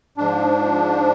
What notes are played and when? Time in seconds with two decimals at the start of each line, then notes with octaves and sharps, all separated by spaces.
0.18 G#2 F3 D4